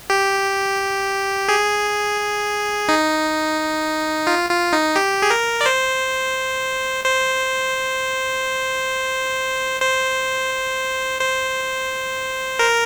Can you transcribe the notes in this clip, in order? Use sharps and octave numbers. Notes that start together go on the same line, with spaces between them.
G4
G#4
D#4
F4
F4
D#4
G4
G#4
A#4
D5
C5
C5
C5
C5
A#4